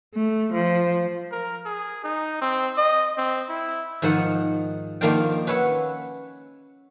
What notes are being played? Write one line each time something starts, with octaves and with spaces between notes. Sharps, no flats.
A3
F3
A#4
G#4
D#4
C4
D#5
C4
E4
G#2 D#3 F3 D#4 F#5
D#3 F3 A#3 D4 F4 G5
C#4 B4 C#5 E5 F#5